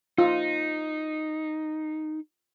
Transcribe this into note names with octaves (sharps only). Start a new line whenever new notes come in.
D#4 F4